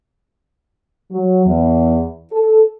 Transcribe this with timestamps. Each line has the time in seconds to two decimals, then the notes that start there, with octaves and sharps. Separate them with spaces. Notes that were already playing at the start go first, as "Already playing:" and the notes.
1.11 F#3
1.46 E2
2.32 A4